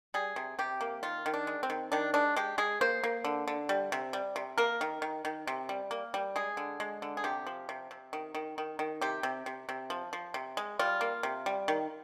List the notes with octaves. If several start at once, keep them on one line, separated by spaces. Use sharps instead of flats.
G3 G#4
C3
C3 G4
A#3
D#3 F4
D#3
D4
G#3
C4
D#3
D#3 D4
G#3 D4
G#3 G4
G#3 G#4
A#3 C5
A#3
D3
D3
G3
C3
G3
C3
A#3 A#4
D#3
D#3
D#3
C3
G3
A#3
G3
G#3 G#4
D3
G#3
D3
G#4
C3 G4
F3
C3
C3
D#3
D#3
D#3
D#3
C3 G4
C3
C3
C3
F3
F3
C3
G#3
G3 F4
A#3
C3
G3
D#3